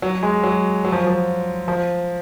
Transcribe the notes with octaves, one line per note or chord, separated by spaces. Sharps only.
F#3
G#3
F#3
F#3
F3
F3
F3